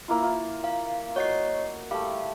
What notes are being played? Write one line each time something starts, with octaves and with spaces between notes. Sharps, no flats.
A#3 E4 F4
F4
F5
F#4 C#5 D#5 C7
G3 A3 F5